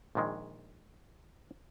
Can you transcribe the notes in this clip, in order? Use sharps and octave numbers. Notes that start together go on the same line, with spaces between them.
A#1 A#2 D#3 G#3